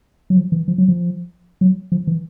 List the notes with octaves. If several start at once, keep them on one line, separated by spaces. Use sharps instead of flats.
F#3
F3
E3
F3
F#3
F3
F#3
F3
E3